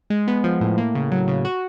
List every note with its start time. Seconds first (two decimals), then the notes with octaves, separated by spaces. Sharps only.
0.10 G#3
0.28 B3
0.44 F3
0.61 A2
0.78 A#3
0.95 C#3
1.12 F#3
1.28 C#3
1.45 F#4